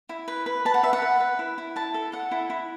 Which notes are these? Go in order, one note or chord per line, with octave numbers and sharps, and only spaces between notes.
E4
B4
B4
B4 A5
F#5
B4 E5
F#5
B4
B4
E4
E4
E4 A5
A4
A4 F#5
E4
E4